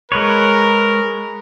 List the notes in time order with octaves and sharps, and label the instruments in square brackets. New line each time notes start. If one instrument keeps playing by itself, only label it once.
[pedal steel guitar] G#3 B4 C#5 [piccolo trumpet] A#4